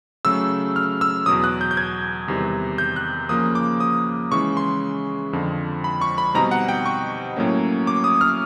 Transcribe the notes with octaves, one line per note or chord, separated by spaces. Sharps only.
C#3 F#3 A3 E6
F6
E6
E2 B2 F#3 D#6
F#6
G6
G6
G#6
E2 C3 D#3 G3
G6
F#6
C#3 F3 A#3 D#6
D6
D#6
C#3 E3 G#3 C#6
C6
F2 D3 F3
B5
C#6
B5
B2 G3 C4 D#4 A#5
F#5
G5
C#6
A2 F#3 A#3 C#4
D6
D#6
F6